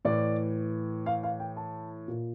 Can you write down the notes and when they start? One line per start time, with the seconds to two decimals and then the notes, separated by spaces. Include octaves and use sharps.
0.05 A2 E3 D5
1.06 F5
1.23 F5
1.40 G5
1.57 A5
2.08 A#2